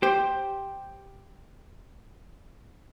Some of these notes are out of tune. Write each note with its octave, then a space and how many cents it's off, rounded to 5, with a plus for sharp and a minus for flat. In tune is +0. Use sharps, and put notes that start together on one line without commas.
G4 +0 C5 +5